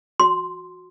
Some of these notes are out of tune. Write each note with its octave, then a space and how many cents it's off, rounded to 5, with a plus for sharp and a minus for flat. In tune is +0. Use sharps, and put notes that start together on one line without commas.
F#4 -20 C6 +0